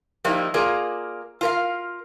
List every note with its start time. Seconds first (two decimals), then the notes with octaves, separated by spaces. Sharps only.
0.24 F3 G3 A#3 D#4 E4
0.54 A#3 F4 G#4 A#4 D5
1.41 F4 A#4 F5